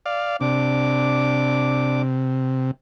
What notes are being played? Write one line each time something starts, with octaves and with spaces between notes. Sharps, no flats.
D5 F5
C3 D4 D6